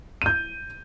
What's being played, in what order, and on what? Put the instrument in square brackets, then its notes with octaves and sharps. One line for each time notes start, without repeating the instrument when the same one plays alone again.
[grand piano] G6 D#7